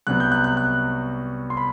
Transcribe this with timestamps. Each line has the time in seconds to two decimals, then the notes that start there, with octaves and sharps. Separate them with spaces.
0.07 C2 C3 F#3 B3 F#6
0.20 G6
0.32 F#6
0.44 F#6
0.57 F#6
1.50 C6
1.57 B5